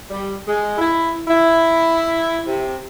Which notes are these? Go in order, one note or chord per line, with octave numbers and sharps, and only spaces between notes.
G3
G#3
E4
E4
C3